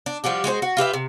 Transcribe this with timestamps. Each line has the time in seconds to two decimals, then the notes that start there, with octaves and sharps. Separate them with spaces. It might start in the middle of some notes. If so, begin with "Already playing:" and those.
0.06 D4
0.24 F3 G3 F#4 G4
0.44 G#3 F#4 G4 C5
0.62 F#4
0.77 F4 G4 B4 E5
0.94 C3